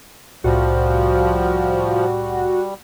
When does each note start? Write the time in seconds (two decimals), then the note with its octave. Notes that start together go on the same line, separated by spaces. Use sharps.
0.44 C2 A2 F3 G3 F#4